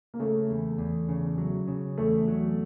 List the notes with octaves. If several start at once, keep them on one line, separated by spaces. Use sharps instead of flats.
A#3
C#3 A3
E2
E2
C#3
F#3
C#3
E2 A3
F#3